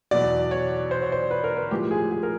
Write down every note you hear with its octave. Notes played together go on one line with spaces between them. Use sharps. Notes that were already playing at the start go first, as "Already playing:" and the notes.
E2 B2 F#3 D5
C#5
C5
C#5
C5
B4
A#4
B4
A2 F3 G#3 G4
G#4
G#4
A#4